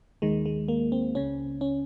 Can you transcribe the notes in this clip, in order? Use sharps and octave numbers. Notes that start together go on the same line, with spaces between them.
D#2 D#3 G#3
G#3
A#3
C4
C#2 C#3 C#4
C#4